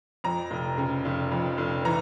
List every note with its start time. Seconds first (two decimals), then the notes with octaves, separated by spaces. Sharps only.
0.24 F2 A#5
0.51 F1
0.78 C#3
1.05 F1
1.32 F2
1.58 F1
1.85 E3 A#5